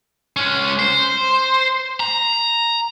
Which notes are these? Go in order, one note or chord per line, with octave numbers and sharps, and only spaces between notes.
G#3 C#4
C5
A#5